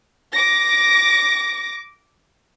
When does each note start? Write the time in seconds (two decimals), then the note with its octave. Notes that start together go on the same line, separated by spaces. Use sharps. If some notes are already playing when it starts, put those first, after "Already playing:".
0.33 D6 A#6